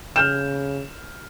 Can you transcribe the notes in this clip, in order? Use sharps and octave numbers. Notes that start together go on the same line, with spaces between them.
C#3 F6 G6 E7